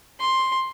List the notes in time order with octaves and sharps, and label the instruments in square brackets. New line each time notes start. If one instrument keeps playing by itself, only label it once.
[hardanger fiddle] C6